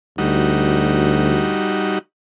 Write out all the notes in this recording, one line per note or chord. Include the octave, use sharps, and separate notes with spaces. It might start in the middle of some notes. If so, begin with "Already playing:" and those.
D2 G3 D#4 F#4